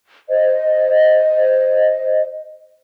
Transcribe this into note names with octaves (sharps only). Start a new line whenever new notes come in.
C5 D#5